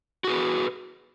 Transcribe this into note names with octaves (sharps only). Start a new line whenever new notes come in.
F#4 G#4 B4